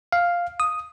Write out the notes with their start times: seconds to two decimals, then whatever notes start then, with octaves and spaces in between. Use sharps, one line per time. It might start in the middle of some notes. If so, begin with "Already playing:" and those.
0.12 F5
0.60 D#6